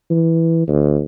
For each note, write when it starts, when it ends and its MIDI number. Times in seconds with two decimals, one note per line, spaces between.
0.11 0.65 52
0.68 1.03 38